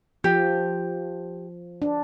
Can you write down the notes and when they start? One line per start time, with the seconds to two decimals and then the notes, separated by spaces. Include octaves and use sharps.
0.24 F3 G4
1.82 D4